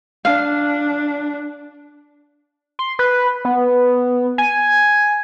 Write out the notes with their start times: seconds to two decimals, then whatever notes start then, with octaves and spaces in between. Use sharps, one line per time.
0.25 D4 F5
2.79 C6
2.99 B4
3.45 B3
4.38 G#5